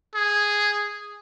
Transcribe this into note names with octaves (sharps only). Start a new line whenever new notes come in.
G#4